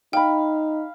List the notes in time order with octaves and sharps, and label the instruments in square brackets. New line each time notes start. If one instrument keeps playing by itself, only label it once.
[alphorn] D#4 [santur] F5 B5 [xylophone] G5